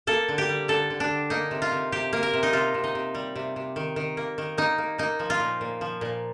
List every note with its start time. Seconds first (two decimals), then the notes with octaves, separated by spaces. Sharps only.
0.07 A#3 A4
0.28 D3
0.38 G4
0.49 G3
0.68 D3 A4
0.90 D3
1.00 D4
1.11 D3
1.30 A#3 D#4
1.51 C3
1.62 F4
1.71 C3
1.92 C3 G4
2.13 A#3
2.23 A#4
2.33 C3
2.43 D#4
2.53 C3 F4
2.74 C3
2.84 D#4
2.95 C3
3.15 G3
3.36 C3
3.56 C3
3.76 D#3
3.96 D#3
4.17 A#3
4.38 D#3
4.57 A#3 D#4
4.78 A#3
4.98 A#3 D#4
5.19 F3
5.30 F4
5.40 A#2
5.61 A#2
5.81 F3
6.01 A#2